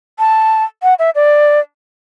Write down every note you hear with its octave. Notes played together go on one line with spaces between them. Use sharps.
A5
F#5
E5
D5